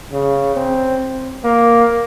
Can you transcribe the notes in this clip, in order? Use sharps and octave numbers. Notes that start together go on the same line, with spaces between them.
C#3
C4
A#3